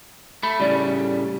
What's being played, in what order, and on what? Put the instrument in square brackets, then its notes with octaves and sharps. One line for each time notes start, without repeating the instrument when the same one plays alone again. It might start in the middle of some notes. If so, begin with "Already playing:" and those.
[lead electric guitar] A3 [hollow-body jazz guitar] B5
[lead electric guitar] A2 C#3 [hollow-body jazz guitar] G3 D5